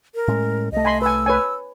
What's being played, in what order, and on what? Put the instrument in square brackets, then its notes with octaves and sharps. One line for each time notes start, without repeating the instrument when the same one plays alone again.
[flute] A#4
[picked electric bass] A2 G#3 C#4
[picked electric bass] C2 A3 [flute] D#5
[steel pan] G#5 B5 C6
[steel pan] B4 G#5 [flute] E6
[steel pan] B4 C#5 G#5